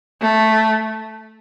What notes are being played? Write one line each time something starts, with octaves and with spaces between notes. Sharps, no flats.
A3